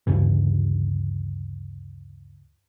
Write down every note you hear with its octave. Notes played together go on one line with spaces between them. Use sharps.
D2 G2 C#3 E3